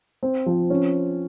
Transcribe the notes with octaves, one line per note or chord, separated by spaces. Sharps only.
C4
F3
C#4